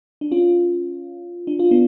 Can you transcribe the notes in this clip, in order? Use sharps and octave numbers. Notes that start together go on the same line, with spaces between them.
D4
C#4 F4
D4
F4
B3 D4